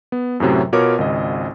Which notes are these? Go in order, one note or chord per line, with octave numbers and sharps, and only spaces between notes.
B3
F#2 A2 C3 F#3
B2 F4 A#4 C#5 D6
G#1 C#2 D#5